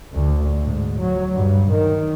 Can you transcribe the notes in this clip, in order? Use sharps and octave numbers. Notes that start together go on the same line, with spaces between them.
D2
G#2
F#3
G2
D#3